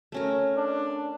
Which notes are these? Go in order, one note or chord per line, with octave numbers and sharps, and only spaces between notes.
A3 C#4 A#4
D4